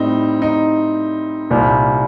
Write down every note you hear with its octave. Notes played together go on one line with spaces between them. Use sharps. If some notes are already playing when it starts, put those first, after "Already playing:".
Already playing: A2 G3 C4 D#4
D#4
C2 A#2 G3